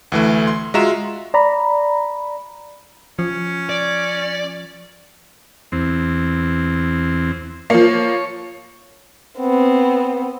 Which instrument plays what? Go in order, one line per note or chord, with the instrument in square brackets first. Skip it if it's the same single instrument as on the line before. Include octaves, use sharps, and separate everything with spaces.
[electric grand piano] D2 E3 A3
C6
G#3 F4 F#4 E5 A#5 E7
[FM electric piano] D5 A#5 B5
[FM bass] F3 [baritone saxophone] C#4
[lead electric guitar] D5
[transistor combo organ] E2 C4
[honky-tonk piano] F3 A#3 [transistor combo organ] C#5
[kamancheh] B3 C4